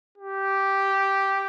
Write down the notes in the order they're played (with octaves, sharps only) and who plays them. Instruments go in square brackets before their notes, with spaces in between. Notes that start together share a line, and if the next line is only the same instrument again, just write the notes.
[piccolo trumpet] G4